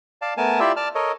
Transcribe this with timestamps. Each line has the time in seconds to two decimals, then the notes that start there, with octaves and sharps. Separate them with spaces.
0.22 D5 F5 A5
0.37 A3 B3 A#4 G#5 A5
0.60 E4 F4 G4 D5 E5 E6
0.77 D5 A5 F6
0.95 A4 A#4 C#5 D#5